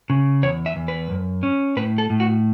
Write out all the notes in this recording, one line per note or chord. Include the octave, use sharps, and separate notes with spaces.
C#3
E2 C#5
E5
E2
B4
F#2
C#4
A2 B4
A4
A2
F#4